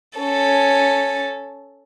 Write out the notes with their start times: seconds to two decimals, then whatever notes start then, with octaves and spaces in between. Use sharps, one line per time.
0.19 C#4 A4